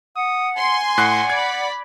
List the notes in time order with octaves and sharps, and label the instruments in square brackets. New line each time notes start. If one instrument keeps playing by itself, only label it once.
[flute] F#5 [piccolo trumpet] D#6
[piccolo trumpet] G#5 [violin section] C6
[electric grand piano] A2 F#6 C7 [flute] F#5
[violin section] D5 B5 [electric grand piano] G#6